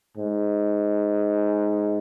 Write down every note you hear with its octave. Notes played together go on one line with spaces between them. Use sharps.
G#2